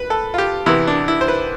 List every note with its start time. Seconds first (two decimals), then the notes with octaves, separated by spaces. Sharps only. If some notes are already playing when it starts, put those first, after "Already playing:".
Already playing: B4
0.10 A4
0.34 F4
0.38 G4
0.66 E2 C3 E3 E4
0.87 D4
1.08 E4
1.21 C5
1.28 B4